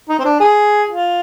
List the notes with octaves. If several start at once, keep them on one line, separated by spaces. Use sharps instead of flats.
D#4
C4
D4
G#4
F4